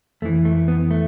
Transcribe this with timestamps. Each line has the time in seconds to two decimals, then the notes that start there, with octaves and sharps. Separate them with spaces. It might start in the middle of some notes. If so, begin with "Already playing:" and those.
0.22 F2 E3 A3
0.45 A3
0.68 B3
0.91 A3